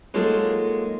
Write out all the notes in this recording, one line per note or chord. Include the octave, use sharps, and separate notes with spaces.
F#3 G#3 A#3 D#4 F4 A4